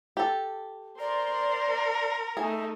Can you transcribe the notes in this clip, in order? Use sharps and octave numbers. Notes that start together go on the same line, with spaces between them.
G4 A4
A#4 C5 D5 C6
A3 D#4 G#4 E5